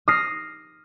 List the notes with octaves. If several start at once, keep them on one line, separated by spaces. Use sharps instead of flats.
D#6 F6 A#6 C7